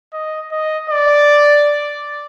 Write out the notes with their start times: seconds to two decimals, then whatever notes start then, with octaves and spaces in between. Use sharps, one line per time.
0.13 D#5
0.51 D#5
0.90 D5